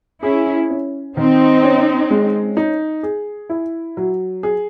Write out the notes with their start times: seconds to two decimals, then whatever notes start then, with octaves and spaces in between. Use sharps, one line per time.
0.23 C#4 E4 G#4
0.70 C#4
1.17 D#3 C4 D#4
1.63 C#4
2.10 G#3
2.57 D#4
3.03 G#4
3.50 E4
3.97 F#3
4.43 G#4